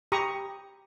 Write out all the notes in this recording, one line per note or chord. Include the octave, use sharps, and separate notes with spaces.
G4 A#5 B5 C#6 D#6